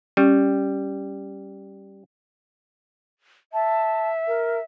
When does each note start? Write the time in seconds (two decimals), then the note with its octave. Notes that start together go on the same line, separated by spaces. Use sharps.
0.17 G3 C#4
3.53 E5 A5
4.27 A#4